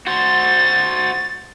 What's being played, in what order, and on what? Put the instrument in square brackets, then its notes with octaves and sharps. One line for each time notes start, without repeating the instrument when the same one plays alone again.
[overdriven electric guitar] F#4 C5 [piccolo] A6